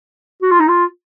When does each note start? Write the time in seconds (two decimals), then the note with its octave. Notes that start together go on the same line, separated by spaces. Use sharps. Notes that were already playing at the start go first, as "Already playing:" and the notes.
0.42 F#4
0.51 F4
0.60 D#4
0.68 F4